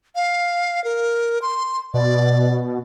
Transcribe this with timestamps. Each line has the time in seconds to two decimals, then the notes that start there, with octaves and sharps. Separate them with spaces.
0.15 F5
0.84 A#4
1.42 C6
1.94 B2 D5